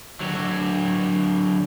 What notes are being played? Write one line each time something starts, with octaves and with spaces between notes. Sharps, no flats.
D3 F#3